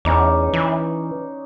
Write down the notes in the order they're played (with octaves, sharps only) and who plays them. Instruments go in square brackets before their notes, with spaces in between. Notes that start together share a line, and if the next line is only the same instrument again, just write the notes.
[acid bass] E2 [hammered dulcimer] C#4 D#4 D5
[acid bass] E3